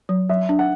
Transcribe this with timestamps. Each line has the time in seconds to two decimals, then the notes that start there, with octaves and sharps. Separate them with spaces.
0.09 F#3
0.29 F#3 E5
0.49 D4
0.59 F#5